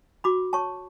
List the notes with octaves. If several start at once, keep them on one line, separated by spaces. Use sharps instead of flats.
F#4 B5 D6
C#5 A5 C#6